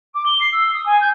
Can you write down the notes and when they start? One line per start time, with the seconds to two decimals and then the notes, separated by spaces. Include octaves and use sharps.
0.14 D6
0.26 G7
0.40 C7
0.52 E6
0.74 D#6
0.86 G#5
1.01 G6